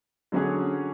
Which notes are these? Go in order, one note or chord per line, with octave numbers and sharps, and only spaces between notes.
D3 F#3 C#4 G#4